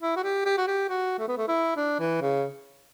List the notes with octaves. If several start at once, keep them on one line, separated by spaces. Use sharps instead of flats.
E4
F#4
G4
G4
F#4
G4
F#4
A3
B3
A3
E4
D4
E3
C#3